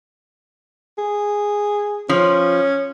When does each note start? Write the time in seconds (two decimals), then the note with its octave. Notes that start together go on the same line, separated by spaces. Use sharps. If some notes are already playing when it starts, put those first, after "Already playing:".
0.98 G#4
2.09 F3 C#4